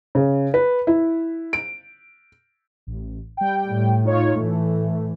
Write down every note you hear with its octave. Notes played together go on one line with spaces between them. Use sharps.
C#3
B4
E4
D7
A1
G3 G5
A2
D#4 F4 C#5
A2 E3 A3